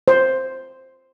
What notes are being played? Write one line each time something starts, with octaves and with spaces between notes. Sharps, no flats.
C5